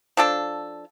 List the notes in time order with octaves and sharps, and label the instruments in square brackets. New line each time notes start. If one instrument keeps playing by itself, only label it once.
[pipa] F3 D4 A4